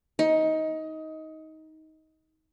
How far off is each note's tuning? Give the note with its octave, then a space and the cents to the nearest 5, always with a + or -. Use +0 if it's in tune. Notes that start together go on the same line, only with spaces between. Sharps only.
D#4 +20